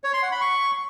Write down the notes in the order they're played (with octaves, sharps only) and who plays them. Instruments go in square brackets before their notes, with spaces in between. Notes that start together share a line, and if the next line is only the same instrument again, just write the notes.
[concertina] C#5
C6
F#5
B5
C#6